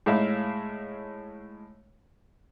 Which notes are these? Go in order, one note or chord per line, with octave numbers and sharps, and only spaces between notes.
A2 G#3 D#4 E5 F5 B5